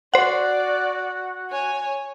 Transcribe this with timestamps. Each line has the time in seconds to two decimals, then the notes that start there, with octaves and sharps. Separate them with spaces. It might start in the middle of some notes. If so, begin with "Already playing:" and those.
0.14 F#4 C5 D5 F#5
1.51 C#5 G#5